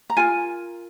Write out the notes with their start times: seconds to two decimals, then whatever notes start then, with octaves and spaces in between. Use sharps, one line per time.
0.10 A#5
0.17 F4 A#4 G#5